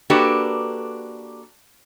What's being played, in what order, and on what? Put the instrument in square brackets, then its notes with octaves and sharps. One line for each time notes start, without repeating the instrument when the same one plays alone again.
[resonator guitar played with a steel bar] A#3 D4 F#4 G4 A4 B4